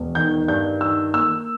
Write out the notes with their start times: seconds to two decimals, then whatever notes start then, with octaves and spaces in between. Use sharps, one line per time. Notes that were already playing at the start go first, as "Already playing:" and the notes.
Already playing: E1
0.15 D#3 G6
0.48 G2 G6
0.81 D#3 E6
1.14 A#3 E6